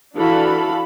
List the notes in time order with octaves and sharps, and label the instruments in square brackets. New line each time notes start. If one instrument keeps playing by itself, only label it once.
[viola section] E3 D4 F#4 A4 F5 B5